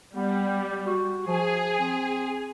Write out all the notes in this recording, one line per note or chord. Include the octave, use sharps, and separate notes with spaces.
G3 B3
F#4
F3 G#4
C4